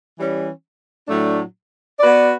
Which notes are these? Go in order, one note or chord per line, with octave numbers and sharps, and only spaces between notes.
E3 G3 C#4
A2 F#3 A3 D4
B3 F#4 B4 D5